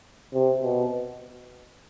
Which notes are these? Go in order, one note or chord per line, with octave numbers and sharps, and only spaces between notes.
C3
B2